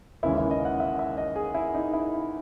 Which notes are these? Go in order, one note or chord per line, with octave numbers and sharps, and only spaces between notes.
D#2 C#3 E3 G#3 C#4 E4
E4
D#5
F#5
E5
E5
D#5
G#4
E4
D#4
E4